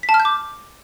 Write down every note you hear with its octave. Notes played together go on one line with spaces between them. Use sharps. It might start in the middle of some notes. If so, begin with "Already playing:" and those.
B6
A5
F6
G6
D6